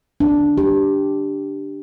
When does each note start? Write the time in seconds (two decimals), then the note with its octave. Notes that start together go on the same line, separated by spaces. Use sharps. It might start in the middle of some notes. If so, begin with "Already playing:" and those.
0.20 D4
0.58 G4